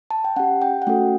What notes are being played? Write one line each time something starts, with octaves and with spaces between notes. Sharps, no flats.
A5
G5
C#4 G4 F#5
G5
F#5
A3 C#4 F#4 A4 G5